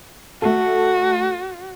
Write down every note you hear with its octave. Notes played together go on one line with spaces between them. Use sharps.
A3 F#4 A4